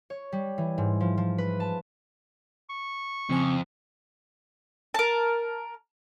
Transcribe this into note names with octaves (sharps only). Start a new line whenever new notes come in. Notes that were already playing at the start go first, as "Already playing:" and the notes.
C#5
G3
E3
G#2
F3
F3
B4
A5
C#6
F2 C#3 C4 G#5
A#4 A5